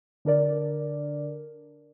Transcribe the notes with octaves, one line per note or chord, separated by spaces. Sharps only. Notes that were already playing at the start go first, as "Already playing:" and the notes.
D3 D4 A#4 D5